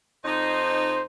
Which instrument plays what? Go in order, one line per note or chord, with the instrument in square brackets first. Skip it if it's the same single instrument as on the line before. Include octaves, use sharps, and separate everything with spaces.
[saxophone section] F2 D#4 [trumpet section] C5